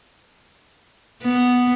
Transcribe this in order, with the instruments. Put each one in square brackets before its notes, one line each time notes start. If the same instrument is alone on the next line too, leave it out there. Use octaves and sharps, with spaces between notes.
[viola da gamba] B3